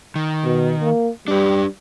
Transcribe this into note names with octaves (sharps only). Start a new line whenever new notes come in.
D#3
B2
A#3
G3 D4 B4